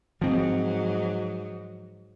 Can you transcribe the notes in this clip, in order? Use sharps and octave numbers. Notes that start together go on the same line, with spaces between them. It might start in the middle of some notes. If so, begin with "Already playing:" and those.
G#2 F3 F#3 C4